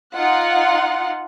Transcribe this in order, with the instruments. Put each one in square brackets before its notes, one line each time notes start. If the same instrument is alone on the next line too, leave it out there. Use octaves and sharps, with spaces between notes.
[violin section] D#4 F4 F#5